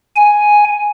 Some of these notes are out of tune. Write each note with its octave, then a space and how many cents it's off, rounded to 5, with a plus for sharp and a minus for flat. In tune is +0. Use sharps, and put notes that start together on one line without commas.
G#5 +0